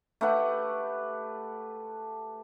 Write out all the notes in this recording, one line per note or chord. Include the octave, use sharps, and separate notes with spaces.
A3 G4 B4 F#5